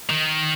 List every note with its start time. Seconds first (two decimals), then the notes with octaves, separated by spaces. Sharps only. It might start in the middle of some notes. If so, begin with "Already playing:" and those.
0.10 D#3